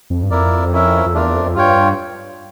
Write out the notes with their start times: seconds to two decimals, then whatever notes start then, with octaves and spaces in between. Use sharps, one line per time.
0.10 F2
0.23 G2
0.31 F2 A#3 E4 A#4 D5
0.73 C#4 E4 A#4 E5
1.06 F2
1.14 E2 A3 D4 F4 A#4 D5
1.35 F2
1.55 G2 F4 C#5 G5